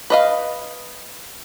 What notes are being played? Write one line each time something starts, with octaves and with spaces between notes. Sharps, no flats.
B4 D#5 F5